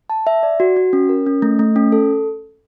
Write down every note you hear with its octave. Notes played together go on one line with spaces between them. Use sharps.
A5
E5
D5
F#4
F#4
C#4
A#4
C#4
A3
A3
C#4
A4